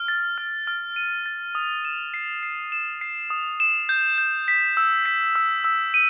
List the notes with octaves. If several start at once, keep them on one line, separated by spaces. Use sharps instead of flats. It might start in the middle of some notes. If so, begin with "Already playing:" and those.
Already playing: F6
A6
F6
F6
D#7
A6
D#6
E7
C7
C7
E7
C7
D#6
E7
G6
G6
B6
E6
B6
E6
E6
D#7